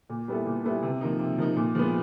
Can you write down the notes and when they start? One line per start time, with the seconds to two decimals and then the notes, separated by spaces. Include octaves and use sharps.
0.10 A#2
0.28 G3 B3 E4 A4
0.46 A#2
0.64 G3 B3 E4 A4
0.83 C3
1.01 F3 A#3 D#4
1.19 C3
1.38 F3 A#3 D#4
1.56 A#2
1.75 F3 G#3 B3